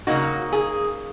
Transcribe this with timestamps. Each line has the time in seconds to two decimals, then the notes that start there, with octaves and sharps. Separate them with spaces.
0.07 C#3 F#3 A#3 D#4 F#4
0.53 G#4